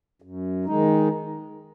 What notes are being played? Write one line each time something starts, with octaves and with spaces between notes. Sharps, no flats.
F#2
D#3 G#3 D#4